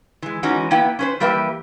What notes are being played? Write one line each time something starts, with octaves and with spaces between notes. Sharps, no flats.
E3 G#3
E3 G#3 C#4 D#4 F#4
A#3 B3 E4 G5
C#4 B4 C5
E3 G3 A#3 G4 B4 E5